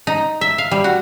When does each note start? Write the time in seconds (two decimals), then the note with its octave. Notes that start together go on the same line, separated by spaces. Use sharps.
0.07 D#4
0.41 E5
0.58 F5
0.71 G3
0.84 F#4